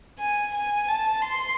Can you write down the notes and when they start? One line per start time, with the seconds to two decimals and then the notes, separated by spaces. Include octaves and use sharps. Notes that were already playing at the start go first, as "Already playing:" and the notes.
0.19 G#5
0.54 G#5
0.88 A5
1.22 C6